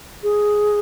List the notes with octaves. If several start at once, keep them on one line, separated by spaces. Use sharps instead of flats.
G#4